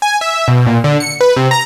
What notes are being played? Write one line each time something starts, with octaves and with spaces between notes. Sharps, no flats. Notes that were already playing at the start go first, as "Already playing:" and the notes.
G#5
E5
B2
A#2
D3
C#7
B4
C3
A#5